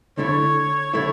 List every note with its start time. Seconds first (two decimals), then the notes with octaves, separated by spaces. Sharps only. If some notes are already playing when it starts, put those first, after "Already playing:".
0.18 D3 A3 E4 C#5
0.94 D3 A3 E4 C#5